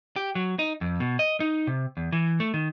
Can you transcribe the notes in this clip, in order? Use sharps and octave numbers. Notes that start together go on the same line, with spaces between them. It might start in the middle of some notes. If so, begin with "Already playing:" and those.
G4
F#3
D#4
F2
B2
D#5
D#4
C3
E2
E3
A3
D#3